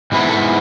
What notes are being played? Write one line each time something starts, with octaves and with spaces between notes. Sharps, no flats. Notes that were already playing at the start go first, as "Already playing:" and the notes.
G#2 E3 G#3 B3 E4
A4